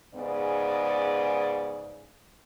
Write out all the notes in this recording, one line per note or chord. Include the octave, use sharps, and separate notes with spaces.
G#2 C#3 B3 G#4 D5